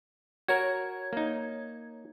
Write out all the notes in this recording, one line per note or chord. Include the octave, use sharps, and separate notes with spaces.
F#4 A#4 C#5 G#6
A#3 D#4